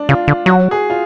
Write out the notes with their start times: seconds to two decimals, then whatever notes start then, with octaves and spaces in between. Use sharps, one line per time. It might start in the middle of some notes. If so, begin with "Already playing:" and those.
Already playing: D4
0.09 C#3 F4
0.28 D3
0.46 F#3 F#4
0.71 G#4
0.90 F4